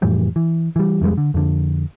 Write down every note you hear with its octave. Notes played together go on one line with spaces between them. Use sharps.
F2 A2 E3 G3
E3
E3 G3
F1 F2 G3 G#3
D3
F2 D3